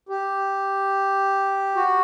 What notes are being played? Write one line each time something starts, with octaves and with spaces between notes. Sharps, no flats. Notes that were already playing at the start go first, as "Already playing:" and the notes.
G4
F#4